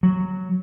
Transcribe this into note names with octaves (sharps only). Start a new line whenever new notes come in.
F#3